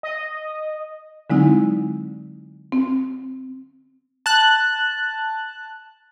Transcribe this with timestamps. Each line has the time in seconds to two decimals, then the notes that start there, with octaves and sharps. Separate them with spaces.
0.03 D#5
1.30 D3 F#3 G#3 C4 D#4 E4
2.72 C4
4.26 A5 F#6